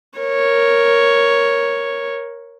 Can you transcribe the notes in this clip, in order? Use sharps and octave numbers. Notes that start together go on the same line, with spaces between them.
A#4 C#5